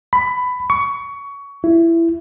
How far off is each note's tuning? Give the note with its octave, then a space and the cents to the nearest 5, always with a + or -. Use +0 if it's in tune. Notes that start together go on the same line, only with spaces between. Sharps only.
B5 +15
C#6 +20
E4 +15